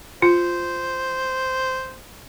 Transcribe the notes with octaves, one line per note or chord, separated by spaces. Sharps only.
F4 C5